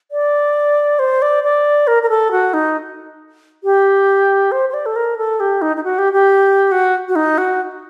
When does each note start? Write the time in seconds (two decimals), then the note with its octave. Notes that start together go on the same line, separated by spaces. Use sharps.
0.12 D5
0.99 C5
1.22 D5
1.44 D5
1.87 A#4
2.03 A#4
2.09 A4
2.32 F#4
2.54 D#4
3.64 G4
4.52 C5
4.69 C5
4.74 D5
4.86 A4
4.96 A#4
5.18 A4
5.40 G4
5.62 D#4
5.77 D#4
5.84 F#4
5.98 G4
6.13 G4
6.72 F#4
7.09 F#4
7.16 D#4
7.38 F#4